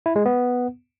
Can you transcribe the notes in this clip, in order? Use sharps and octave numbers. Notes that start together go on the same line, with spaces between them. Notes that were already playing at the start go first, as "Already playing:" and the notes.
E4
G#3
B3